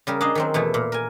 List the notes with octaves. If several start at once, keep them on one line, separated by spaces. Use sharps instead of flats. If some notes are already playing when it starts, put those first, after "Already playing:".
C#3 G3 A#4
D4 D#4 G#4 D#5 F5
D#3 F#3 C4
E2 B2 A3 E4
A#2
A#4 G#5